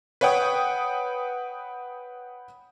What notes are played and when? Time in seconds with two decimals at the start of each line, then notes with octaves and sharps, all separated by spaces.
0.21 B4 C#5 F#5 G5 D#6